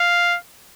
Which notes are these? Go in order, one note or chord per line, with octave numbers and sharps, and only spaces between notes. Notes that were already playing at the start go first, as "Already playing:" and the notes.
Already playing: F5